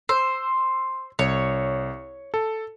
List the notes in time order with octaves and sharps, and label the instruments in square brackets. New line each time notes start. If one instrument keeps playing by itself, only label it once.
[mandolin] C5 [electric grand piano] E6
[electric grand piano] C2 [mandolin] C#5
[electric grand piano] A4